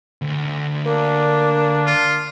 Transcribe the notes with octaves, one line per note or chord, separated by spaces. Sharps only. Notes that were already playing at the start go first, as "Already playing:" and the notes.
D2
A#3 D4
F4